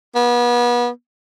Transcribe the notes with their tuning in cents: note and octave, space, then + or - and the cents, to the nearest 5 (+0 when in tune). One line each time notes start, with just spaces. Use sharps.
B3 -35